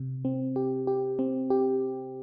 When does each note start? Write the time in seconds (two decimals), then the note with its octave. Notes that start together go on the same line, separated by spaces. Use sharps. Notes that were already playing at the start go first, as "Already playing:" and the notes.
Already playing: C3
0.25 C4
0.56 G4
0.87 G4
1.19 C4
1.50 G4